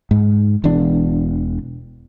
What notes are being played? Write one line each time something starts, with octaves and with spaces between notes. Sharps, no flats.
G#2
E1 E2 D4